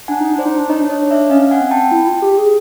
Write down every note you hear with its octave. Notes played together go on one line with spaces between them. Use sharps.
D4 F#5 G#5
D#4
D4
C5 D5
D#4
D4
D#4 C#5 D#5
D4
C#5 D#5
D5 E5
C#4 D#5 F5
F#5 G#5
C4
G5 A5
E4
F4
G4
G#4